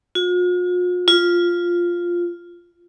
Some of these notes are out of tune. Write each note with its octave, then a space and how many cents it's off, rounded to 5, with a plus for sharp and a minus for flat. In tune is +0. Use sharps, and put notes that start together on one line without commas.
F4 +45
F4 +0